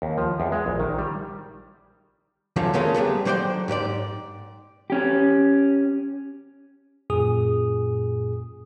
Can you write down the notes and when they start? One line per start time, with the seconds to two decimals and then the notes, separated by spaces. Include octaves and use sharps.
0.02 D#2
0.18 F3
0.40 E2
0.52 G#3
0.66 A#1
0.80 D#3
0.99 G3
2.56 D3 F3 F#3 A3 C#4
2.74 C#3 G#3 A3 C#4 A#4 F5
2.94 G3 A3 B3 G#4
3.25 D3 F#3 C5 D5 G5
3.68 G#2 G4 B4 D5
4.90 C#4 G4
7.10 F#2 A#2 G#4 D#6